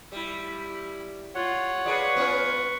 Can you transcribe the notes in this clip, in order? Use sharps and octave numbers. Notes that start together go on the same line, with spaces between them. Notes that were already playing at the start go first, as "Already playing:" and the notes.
G3 E4
F4 C#5 F#5
F4 G#4 B4 D5 C#6
B3 C#4 F4